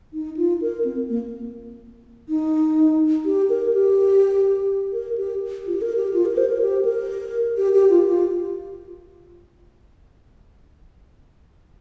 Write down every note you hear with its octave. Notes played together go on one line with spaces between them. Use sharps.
D#4
F4
A#4
C4
A#3
D#4
G4
A#4
G4
A#4
G4
F4
G4
A#4
G4
F4
A#4
C5
A#4
G4
A#4
G4
G4
F4
F4